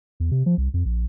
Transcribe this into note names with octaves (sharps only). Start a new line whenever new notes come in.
E2
C3
F3
C2
F2
A#1